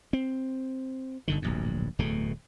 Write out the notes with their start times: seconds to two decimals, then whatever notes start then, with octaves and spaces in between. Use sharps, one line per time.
0.13 C4
1.28 G1 D3 D#3
1.42 D1 A#1 G2
1.99 D1 E2 B2 A3